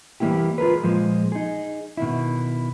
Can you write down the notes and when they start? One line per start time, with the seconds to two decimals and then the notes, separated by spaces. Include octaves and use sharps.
0.20 E3 G3 G#3 A#3 E4 G4
0.58 F4 G#4 A#4 B4
0.83 A#2 F3 G#3
1.32 D#4 G#4
1.97 B2 D#3 E4